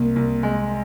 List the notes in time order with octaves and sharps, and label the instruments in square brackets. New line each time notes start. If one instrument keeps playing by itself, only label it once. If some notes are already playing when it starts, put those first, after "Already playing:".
Already playing: [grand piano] C2 [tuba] A#3
[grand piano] C2
G#3